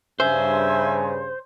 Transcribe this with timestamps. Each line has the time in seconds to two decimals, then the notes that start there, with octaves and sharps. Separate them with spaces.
0.20 G2 C#3 C5 E5 G#5